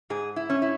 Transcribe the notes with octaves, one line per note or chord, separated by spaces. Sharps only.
G#2 G#4
E4
C#4
E4